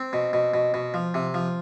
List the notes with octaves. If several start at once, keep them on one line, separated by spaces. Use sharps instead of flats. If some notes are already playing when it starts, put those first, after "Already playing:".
Already playing: C4
B2
B2
B2
B2
F3
C3
F3